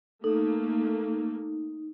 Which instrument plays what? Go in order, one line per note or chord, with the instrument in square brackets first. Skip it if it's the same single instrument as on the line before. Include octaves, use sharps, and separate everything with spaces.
[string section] A3 A#3 [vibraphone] D#4 [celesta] A4